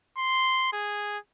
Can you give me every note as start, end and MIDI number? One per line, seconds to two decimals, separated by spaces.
0.18 0.69 84
0.73 1.18 68